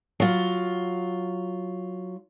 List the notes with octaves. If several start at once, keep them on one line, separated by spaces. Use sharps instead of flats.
F#3 F4